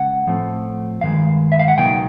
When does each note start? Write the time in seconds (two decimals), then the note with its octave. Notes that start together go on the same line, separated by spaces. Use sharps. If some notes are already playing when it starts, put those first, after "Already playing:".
Already playing: C#2 C#3 G#3 F#5
0.27 A2 F3 A3 C4
1.01 G2 D#3 G#3 F5
1.52 E5
1.59 F5
1.68 F#5
1.77 C#2 B2 F#3 A#3 D#4 G5